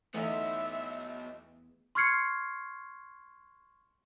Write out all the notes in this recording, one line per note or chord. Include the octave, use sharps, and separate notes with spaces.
E2 A3 B3 D#4 F4 D#5 E5
C6 C#6 F6 G#6 C7 C#7